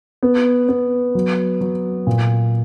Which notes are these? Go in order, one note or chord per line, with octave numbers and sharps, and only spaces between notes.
B3
B3
F#3
F#3
A#2